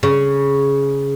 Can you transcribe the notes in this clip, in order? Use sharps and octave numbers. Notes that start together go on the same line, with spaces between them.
C#3